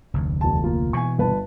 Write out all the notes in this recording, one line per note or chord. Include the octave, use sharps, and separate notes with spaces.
F1 D2
E1 A5
A#3 F4
B2 E3 G#5 C#6
G1 B4 A5